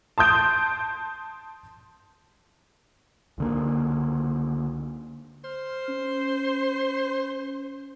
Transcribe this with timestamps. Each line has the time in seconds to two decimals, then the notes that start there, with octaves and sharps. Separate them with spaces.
0.18 A5 C6 D#6 G6 D7
3.38 C#2 D3 A#3
5.44 C5 F6
5.88 C#4